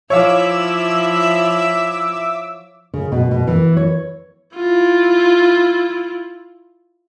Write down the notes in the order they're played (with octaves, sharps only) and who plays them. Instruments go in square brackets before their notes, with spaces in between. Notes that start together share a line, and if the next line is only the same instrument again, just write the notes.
[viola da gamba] F3 E4 [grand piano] C#5 F5 [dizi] E5 [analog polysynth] D6 E6
[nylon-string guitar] C#3
B2
B2
E3
C#5
[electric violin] E4 F4